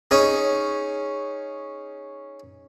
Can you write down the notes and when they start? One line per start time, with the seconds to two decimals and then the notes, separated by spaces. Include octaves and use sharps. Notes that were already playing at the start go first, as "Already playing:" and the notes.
0.11 C#4 D#4 G#4